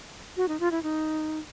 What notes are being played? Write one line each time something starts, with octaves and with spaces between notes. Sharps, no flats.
F#4
D#4
F4
E4
D#4